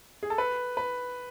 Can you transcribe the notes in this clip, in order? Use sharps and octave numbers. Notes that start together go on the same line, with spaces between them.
G#4
A4
B4
B4